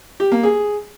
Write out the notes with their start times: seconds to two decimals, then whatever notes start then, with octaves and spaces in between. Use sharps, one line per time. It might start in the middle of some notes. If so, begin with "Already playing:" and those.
0.20 G4
0.32 A#3
0.43 G#4